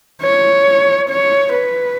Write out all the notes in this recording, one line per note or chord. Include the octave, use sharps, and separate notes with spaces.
C#5
C#5
B4